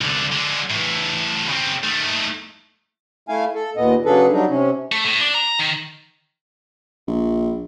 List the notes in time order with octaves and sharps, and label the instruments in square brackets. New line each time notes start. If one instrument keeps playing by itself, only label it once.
[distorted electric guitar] C2 D3
D3 G#3
E2 A2
C#3 C4
D#3 A3
[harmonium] A3 E4 F5 G#5
A4
D#2 A#2 B3 D#5
C#3 F#3 D4 G#4 A4 B4
F#3 G3 D4 D#4
C3 C#4
[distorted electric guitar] A3
A2
D4
A#5
D#3
[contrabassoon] A#1